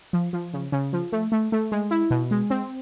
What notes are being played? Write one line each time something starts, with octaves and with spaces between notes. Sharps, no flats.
F3
F3
C#3
C#3
F3
A3
A3
A3
G#3
E4
B2
G#3
C4